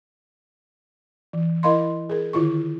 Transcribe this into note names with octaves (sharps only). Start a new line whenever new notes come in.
E3
E4 A#4 D#5 F5 B5 C6
G#4 A#4
D3 D#3 E4 F4 C#6